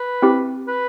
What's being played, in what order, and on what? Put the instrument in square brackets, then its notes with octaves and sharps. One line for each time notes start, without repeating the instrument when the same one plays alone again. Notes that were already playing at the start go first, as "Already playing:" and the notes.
Already playing: [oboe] B4
[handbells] C4 E4 G4
[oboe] B4